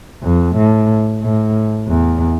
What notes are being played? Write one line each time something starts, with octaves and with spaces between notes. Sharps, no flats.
F2
A2
A2
E2